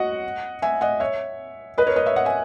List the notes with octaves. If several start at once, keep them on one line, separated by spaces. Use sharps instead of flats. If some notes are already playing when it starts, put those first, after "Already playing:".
Already playing: F#4 D#5 F#5
E5 G#5
D#5 F#5
C#5 E5
B4 D#5
A#4 C#5
B4 D#5
C#5 E5
D#5 F#5
E5 G#5